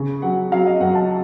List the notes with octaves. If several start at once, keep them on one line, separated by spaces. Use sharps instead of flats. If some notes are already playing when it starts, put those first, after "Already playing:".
Already playing: C#3
F#3 F#5
F#3 F5
D#5
F#2 F#5
A5